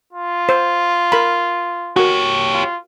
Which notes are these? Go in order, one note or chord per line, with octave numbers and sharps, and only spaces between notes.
F4
C5
A#4 B5
F#4 G4 A#4 C#5
F4